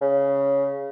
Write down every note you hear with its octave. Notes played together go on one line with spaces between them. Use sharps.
C#3